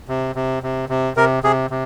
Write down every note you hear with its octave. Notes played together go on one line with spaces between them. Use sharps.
C3
C3
C3
C3
C3 A#4
C3 G#4
C3